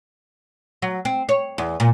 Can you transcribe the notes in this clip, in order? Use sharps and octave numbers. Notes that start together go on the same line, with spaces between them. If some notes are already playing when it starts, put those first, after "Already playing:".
F#3
C4
C#5
E2
A#2